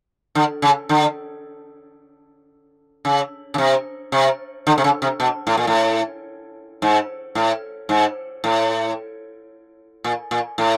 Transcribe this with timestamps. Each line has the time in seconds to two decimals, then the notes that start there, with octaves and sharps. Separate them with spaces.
0.35 D3
0.62 C#3
0.89 D3
3.05 C#3
3.54 C#3
3.58 C3
4.12 C3
4.67 D3
4.78 C3
4.84 C#3
5.02 C3
5.20 B2
5.47 A2
5.57 A#2
5.67 A2
6.82 G#2
7.35 A2
7.89 G#2
8.44 A2
10.04 A#2
10.31 A#2
10.58 A2